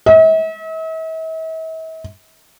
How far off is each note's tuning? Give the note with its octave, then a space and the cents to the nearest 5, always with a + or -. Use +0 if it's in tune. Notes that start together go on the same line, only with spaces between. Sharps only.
E5 -45